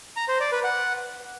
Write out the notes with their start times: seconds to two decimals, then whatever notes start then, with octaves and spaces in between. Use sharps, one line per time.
0.16 A#5
0.28 C5
0.40 D5
0.52 B4
0.64 F#5